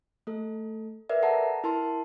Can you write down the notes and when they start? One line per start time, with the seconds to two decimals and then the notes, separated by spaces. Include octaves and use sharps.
0.27 A3 A4
1.09 A#4 B4 D5 E5
1.22 A4 F#5 A5 A#5
1.64 E4 A#4 A5 C6